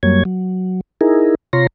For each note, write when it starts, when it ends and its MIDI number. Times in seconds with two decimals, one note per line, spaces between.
0.03 0.23 42
0.03 0.23 54
0.03 0.23 55
0.03 0.23 58
0.03 0.23 73
0.03 0.23 92
0.25 0.81 54
1.01 1.35 63
1.01 1.35 64
1.01 1.35 68
1.01 1.35 70
1.53 1.67 48
1.53 1.67 65
1.53 1.67 73
1.53 1.67 82
1.53 1.67 84
1.53 1.67 94